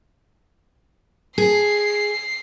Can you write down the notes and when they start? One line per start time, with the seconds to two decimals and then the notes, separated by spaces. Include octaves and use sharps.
1.38 G#4 C7